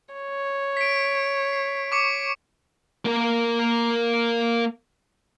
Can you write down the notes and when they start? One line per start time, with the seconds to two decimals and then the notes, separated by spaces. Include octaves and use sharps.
0.14 C#5
0.77 B6 D7
1.53 C7
1.92 C#6 D6 C#7
3.05 A#3 A#4